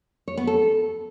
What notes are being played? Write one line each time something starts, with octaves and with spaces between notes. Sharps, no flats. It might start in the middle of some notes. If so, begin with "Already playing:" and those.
C#5
B3
A4